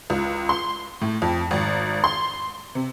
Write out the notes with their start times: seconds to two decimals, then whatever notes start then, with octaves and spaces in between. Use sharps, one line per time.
0.10 C#2
0.49 C6
1.01 A2
1.22 F2
1.51 G#1
2.04 C6
2.75 C3